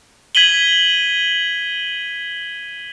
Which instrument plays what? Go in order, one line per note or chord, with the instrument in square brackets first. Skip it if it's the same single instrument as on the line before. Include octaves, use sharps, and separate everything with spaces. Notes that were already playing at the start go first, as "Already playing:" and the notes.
[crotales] G#6 B6 D#7 F#7 G7